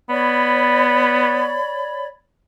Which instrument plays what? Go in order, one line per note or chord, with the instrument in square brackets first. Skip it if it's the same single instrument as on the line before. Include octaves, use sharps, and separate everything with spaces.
[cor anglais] B3 [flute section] C#5 D5 B5